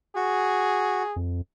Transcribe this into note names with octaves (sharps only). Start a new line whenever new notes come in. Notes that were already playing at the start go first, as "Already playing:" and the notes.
F#4 G#4
F2